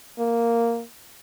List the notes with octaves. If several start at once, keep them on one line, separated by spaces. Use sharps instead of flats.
A#3